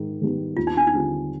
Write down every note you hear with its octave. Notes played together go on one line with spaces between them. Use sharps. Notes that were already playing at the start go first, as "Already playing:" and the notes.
Already playing: G#2 D#3
D#3 G3 B3
D#2 F4
D#4
D4
D#4
D3 G3 C4 F4